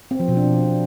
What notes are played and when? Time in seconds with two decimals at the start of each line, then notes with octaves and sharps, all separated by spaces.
0.11 C4
0.20 F3
0.28 B2
0.37 D4